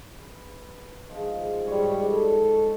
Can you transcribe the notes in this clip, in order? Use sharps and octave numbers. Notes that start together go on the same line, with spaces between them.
B4
D#3 F3 G#3
G#2 G3 C#5 C6
A4